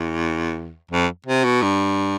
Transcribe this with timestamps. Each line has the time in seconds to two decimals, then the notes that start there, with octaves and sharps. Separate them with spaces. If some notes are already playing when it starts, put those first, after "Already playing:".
Already playing: E2
0.91 F2
1.26 C3
1.44 B2
1.62 G2